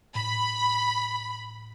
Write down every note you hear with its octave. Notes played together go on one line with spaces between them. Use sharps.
A2 B5